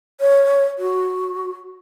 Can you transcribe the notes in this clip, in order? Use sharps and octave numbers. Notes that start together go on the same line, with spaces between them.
C#5
F#4